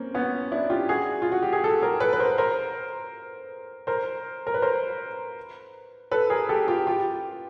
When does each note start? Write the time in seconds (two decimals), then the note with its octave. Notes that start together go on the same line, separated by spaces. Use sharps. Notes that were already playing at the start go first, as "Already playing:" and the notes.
Already playing: A#3 C4 C#4
0.14 B3 C#4
0.52 D4 E4
0.70 F4 G4
0.89 F#4 G#4
1.22 F4
1.32 F#4
1.43 G4
1.53 G#4
1.64 G4 A4
1.82 G#4 A#4
2.00 A4 B4
2.13 B4
2.19 A#4 C5
2.38 A#4 C5
3.87 A#4 C5
4.47 A#4
4.54 B4
4.62 A#4 C5
6.11 A4 B4
6.30 G#4 A#4
6.49 G4 A4
6.68 F4 G4
6.87 F4 G4